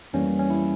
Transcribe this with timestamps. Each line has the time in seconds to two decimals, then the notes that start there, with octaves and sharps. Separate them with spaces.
0.13 F2 E3 G3 A#3 C#4
0.39 C#4
0.50 E4